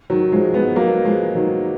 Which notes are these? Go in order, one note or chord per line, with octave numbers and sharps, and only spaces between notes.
D#3 F#3
F3 G#3
G#3 B3
F#3 A#3
F3 G#3
D#3 F#3